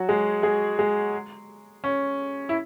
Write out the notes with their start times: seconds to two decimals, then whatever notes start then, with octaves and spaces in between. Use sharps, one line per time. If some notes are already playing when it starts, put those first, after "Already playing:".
Already playing: F#3 F#4
0.09 G#3 G#4
0.43 G#3 G#4
0.79 G#3 G#4
1.84 C#4
2.49 E4